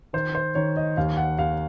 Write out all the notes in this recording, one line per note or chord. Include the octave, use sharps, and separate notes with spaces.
D#3 C5
C5
D#3 C#5
D#5
D#2 F5
F#5
D#2 F5